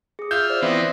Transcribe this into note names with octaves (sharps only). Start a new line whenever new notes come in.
G#4 D#6
F4 E5 G6
C5 D5
E3 B3 C4 E5 D#6 A#6